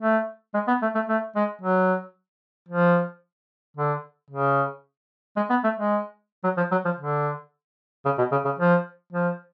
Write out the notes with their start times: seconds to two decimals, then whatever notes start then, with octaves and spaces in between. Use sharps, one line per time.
0.01 A3
0.54 G#3
0.68 B3
0.82 A3
0.95 A3
1.09 A3
1.36 G#3
1.61 F#3
2.69 F3
3.77 D3
4.30 C#3
5.36 G#3
5.50 B3
5.64 A3
5.77 G#3
6.44 F#3
6.57 F3
6.72 F#3
6.85 F3
6.98 D3
8.05 C#3
8.18 B2
8.32 C#3
8.45 C#3
8.59 F3
9.12 F3